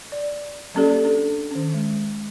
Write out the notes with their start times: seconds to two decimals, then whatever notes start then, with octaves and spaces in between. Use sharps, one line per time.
0.12 D5
0.75 F#3 A#3 C#4 G4 A4 D5
1.05 D4 A4
1.51 D#3 C#4
1.74 G#3